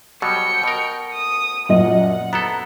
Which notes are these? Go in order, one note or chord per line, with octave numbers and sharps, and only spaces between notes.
B2 F#3 G3 G5 C#7
B2 A#4
D#6
F#2 A#2 D#5 F#5
B3 E4 A4 A#5